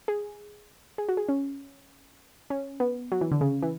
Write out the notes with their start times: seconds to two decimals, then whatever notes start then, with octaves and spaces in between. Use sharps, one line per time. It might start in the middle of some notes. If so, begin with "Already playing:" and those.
0.08 G#4
0.98 G#4
1.09 F#4
1.17 G#4
1.29 C#4
2.50 C#4
2.80 B3
3.12 F#3
3.21 E3
3.31 D3
3.41 C#3
3.62 E3